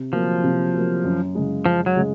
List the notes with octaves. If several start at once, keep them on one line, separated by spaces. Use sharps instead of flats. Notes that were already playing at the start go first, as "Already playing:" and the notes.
Already playing: C3
F3 F#3 A#3
C3
F#3 A#3
F#2
C#3 G#3
F#2 F3
F#3
C#3 G#3